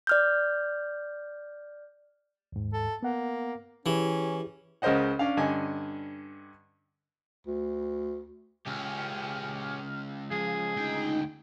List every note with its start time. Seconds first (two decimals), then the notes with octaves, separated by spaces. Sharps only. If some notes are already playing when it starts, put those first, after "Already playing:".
0.07 D5 F6 G6
2.52 D#2 G#2
2.74 A4
3.03 A#3 B3 F#5
3.86 E3 C#4 E4 G4 G#4
4.82 C#2 C#3 A#4 C5 D#5 F#5
5.19 C#4 D4 F5
5.37 G2 D3 C#4 D#5 G#5
7.47 D2
8.67 C#2 C#4 G4 F6
10.31 F3 G#4
10.76 D2 D#4 G5